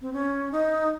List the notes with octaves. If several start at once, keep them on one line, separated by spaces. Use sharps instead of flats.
C4
C#4
D#4